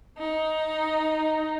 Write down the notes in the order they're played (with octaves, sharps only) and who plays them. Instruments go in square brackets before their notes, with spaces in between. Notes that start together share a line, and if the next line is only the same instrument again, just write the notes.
[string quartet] D#4